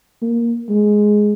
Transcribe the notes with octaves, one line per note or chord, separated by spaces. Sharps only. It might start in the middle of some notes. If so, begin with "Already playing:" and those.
A#3
G#3